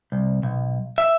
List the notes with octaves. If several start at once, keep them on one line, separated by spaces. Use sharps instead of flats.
C2
B1
E5